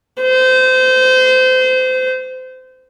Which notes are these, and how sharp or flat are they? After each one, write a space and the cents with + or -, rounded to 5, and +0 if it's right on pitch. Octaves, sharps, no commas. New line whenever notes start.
C5 -25